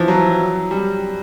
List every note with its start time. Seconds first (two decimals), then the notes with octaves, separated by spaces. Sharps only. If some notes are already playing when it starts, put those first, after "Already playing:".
Already playing: E3 F3
0.08 F#3
0.71 G3